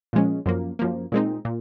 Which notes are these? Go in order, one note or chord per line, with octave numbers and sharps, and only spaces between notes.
A#2 F3 G#3 C#4
F#2 F3 A#3
F#2 F3 A#3
A#2 G#3 C4 D#4
A#2